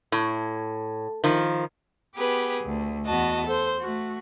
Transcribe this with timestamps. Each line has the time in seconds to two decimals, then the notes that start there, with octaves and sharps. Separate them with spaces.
0.12 A2
1.24 D#3 F3
2.15 B3 G4 G#4 B4
2.62 D2
3.04 E2 B3 F#4 D#5 A5
3.47 A4 C5
3.80 A3 F#4